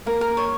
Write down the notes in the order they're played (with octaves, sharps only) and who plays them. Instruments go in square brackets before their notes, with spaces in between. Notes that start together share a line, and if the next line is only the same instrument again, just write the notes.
[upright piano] A#3 [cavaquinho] A#4
[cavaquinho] A#4
C#5